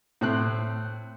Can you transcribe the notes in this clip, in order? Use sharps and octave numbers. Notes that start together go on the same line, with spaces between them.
A2 C4 F#6